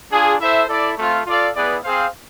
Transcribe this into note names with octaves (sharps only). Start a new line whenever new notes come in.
D4 F4 G#4
E4 A4 C5 E5
E4 A4 D5
A3 C4 F4
F4 A4 D5 F5
B3 E4 G#4 B4 D5
C4 G#4 C5 F5